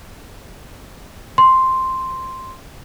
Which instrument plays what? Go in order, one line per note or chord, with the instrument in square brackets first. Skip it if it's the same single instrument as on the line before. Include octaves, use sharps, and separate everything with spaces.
[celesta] C6